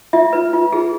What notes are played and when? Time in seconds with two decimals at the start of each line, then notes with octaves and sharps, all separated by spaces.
0.13 F4 E5
0.33 B4
0.53 F4
0.72 G#4